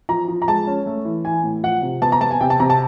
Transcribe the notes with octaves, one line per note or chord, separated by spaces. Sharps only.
F3 A#5
F3
A#5
G#3 A5
C#4
A3
E3
E3 G#5
A2
F3 F#5
C3
B3 A5
A#5
B3 A5
G#5
C3 G5
A5
C3 A#5
A5